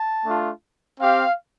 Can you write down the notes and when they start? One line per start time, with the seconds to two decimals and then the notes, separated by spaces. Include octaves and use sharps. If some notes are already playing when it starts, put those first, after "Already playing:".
Already playing: A5
0.25 A3 D4 F4
0.99 C4 G4 F5